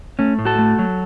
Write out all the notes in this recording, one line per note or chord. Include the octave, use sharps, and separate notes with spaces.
A3 C#4
A2
F#4 A4
A3
F#3